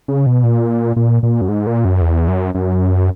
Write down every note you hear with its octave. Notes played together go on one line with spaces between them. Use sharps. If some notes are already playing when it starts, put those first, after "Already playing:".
C#3
B2
A#2
A#2
A#2
F#2
G#2
A#2
F#2
E2
F#2
F#2